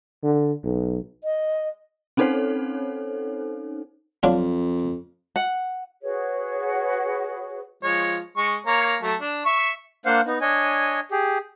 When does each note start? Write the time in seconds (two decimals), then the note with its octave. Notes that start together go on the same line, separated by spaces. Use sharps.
0.23 D3
0.64 B1
1.24 D#5
2.17 C4 C#4 D#4 A4 C5 C#5
4.23 F2 F#3 D4 F4
5.36 F#5
6.02 F#4 G#4 B4 C#5
7.83 F3 G#3 C#5
8.37 G#3 C#6
8.66 A#3 C#5 A#5
9.03 F#3 A3 A5
9.21 D4
9.46 E5 C#6
10.06 A#3 D4 C5 F5 F#5
10.26 B3 D#4
10.41 D4 C#5 D#5 G#5
11.11 G4 G#4